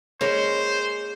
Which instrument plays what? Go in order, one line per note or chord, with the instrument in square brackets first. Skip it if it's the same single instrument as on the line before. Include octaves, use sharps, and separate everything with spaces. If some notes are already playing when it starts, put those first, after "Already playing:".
[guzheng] G#3 A#3 B5 [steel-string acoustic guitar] C#4 C#5 [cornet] C5